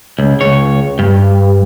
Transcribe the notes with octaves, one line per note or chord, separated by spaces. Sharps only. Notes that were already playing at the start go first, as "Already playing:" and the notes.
C#2
C#2 C#5
G2